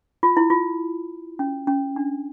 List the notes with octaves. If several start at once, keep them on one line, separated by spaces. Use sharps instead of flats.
F4
E4
F4
C#4
C#4
D4